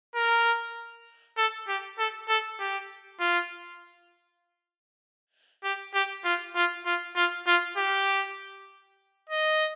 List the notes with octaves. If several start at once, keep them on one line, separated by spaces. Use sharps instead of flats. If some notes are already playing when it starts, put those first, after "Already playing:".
A#4
A4
G4
A4
A4
G4
F4
G4
G4
F4
F4
F4
F4
F4
G4
D#5